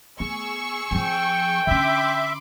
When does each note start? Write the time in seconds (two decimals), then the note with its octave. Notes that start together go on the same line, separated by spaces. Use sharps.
0.20 B3 G#4 C#6 E6
0.91 F3 C4 G5
1.67 D3 C#4 E5 B5 C6 D6